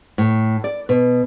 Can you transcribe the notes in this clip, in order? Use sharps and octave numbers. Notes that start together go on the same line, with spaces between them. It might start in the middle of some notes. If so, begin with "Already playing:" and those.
A2
D5
B2